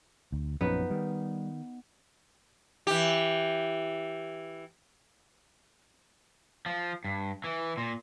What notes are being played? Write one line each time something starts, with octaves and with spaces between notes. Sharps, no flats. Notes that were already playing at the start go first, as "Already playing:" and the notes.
D2
A#1 F#2 F3 B3 C#4 D#4
D#3 G3
E3 G4
F3
G2
E3
A#2